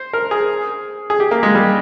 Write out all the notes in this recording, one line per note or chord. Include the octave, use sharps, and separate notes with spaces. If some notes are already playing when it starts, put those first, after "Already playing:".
Already playing: C5
A#4
G#4
G#4
G4
A#3
G#3
G3